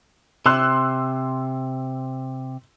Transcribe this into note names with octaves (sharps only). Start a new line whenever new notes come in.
C3 C6 E6 F#6